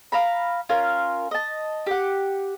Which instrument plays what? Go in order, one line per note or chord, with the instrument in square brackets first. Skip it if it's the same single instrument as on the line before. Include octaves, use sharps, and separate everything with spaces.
[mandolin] F5 A#5 B5
C#4 F4 A#4
D#5 A5
G4 F#5